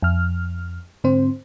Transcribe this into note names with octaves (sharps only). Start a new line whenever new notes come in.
F2 F6
G#2 D3 C4 C5